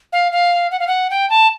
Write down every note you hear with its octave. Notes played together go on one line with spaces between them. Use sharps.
F5
F5
F#5
F5
F#5
G5
A5